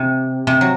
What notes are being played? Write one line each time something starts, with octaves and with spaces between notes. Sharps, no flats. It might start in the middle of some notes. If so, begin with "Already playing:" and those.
Already playing: C3
C3
F#3